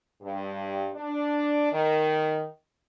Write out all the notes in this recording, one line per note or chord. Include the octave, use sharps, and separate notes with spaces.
G2
D4
D#3